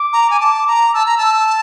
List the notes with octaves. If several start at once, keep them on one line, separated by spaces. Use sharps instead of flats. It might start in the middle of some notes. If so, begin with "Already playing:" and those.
Already playing: D6
A#5
G#5
A5
A#5
A5 E6
A#5
A5